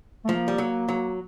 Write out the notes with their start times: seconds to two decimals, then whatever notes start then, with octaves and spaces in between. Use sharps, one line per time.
0.25 A3
0.28 F3 A#3
0.48 G3
0.58 F#3
0.89 F#3